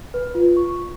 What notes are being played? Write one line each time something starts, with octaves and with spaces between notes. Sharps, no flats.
B4
F4
C#6